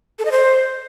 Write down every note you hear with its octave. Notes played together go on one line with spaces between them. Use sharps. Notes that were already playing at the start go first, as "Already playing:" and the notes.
A4
D#5
C5